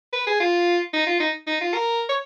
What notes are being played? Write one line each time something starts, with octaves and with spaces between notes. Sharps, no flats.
B4
G#4
F4
D#4
F4
D#4
D#4
F4
A#4
C#5